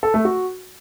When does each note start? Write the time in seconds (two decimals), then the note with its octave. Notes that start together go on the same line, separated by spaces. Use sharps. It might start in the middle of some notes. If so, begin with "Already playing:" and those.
0.03 A4
0.14 A3
0.25 F#4